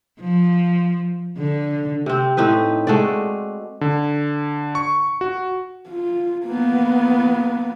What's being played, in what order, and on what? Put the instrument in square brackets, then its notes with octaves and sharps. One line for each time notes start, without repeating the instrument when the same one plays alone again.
[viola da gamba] F3
D3
[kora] C3 C4
A2 C4 D#4 B4
G#3 A3 F#4 D5
[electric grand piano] D3
C#6
F#4
[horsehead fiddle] F4
A#3 B3